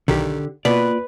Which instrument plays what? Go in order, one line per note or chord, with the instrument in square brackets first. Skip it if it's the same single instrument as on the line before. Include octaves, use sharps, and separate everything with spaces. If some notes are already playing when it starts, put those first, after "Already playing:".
[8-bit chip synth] B1 D#3 [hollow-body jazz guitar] D3 G4
[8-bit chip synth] B2 [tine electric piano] A#3 F4 [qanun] B4 [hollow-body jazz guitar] D5